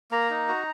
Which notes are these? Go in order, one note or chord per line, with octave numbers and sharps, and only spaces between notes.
A#3 A#5
D#4
F#4